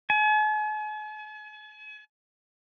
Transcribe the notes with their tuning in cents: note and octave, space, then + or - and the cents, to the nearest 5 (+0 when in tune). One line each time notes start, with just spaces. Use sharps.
G#5 +45